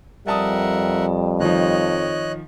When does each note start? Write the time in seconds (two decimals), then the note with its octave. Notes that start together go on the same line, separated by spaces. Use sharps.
0.27 F2 G3 A#4 D5 E5 F#5 A5 D#6
1.40 D#3 F3 C#5 D#5 F#6